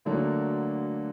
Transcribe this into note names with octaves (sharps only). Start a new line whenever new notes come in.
D2 D3 F#3 A#3 D4